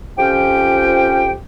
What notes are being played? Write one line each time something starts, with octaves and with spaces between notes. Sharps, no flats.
F2 F3 C#4 G4 G5